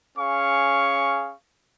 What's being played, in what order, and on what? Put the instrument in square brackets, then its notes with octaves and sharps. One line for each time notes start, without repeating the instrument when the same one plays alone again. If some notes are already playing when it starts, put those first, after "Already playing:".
[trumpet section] C#4 G#4 F5 C#6